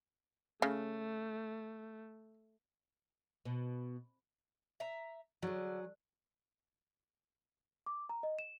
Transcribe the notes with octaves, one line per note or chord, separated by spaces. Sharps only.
C#3 A3
B2
E5 A#5
D3 F#3 G#4
D6
A#5
D#5
E7